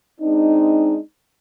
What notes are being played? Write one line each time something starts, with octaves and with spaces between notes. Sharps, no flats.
G#3 C4 D4 D#4